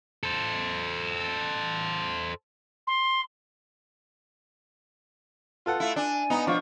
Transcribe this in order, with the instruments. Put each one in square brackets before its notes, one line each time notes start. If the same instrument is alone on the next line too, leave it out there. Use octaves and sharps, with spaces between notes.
[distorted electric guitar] A4 C5
[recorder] C6
[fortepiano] F4 A4 F#5 [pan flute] B4
[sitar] A3 E4 [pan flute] F5
[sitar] D4 [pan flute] G#5
[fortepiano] B3 [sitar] D#4
[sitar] F3 [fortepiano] B3 D4 F4 [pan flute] C#6